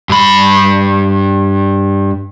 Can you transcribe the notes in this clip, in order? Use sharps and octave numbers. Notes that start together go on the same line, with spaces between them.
G2 B5